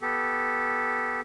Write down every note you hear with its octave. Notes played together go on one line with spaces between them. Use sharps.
B3 G4 A4